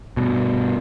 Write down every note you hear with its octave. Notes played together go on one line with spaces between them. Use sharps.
G2 B2